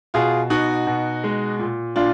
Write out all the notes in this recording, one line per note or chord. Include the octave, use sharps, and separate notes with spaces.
B2 F4 G#4
B2 D#4 F#4
B2
G#3
A#2
A#2 D4 F4